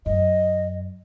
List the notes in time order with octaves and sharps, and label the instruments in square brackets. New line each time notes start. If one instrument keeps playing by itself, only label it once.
[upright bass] F#2 [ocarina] D#5